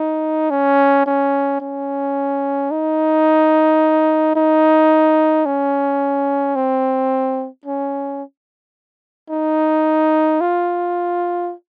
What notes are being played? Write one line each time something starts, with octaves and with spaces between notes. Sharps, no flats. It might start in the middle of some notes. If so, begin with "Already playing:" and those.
Already playing: D#4
C#4
C#4
C#4
D#4
D#4
C#4
C4
C#4
D#4
F4